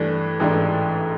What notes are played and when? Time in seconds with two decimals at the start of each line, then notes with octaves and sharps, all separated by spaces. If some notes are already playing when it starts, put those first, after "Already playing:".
Already playing: G2 E3 A3 D4
0.40 A1 G#2 E3 A3 D4